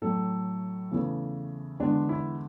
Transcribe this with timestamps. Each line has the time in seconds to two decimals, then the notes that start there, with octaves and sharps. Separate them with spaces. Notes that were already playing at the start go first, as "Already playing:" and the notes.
0.02 A2 F#3 A3 A4
0.92 E2 C#3 E3 A3
1.80 E2 D3 G#3 D4
2.09 E4